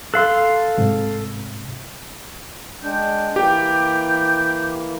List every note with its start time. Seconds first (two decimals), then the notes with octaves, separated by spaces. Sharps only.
0.14 A4 F5 C6 F#6
0.78 G#2 C3
2.83 G#3 D4 G5
3.36 E3 A#3 G4 G5